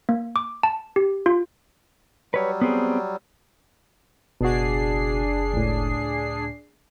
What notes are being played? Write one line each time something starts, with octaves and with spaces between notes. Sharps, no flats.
A#3
D6
A5
G4
F4
F#3 G3 B4 C#5
B3 C4 G#4
F#1 B2 D4 F#4 G#4 C7
C#2 A2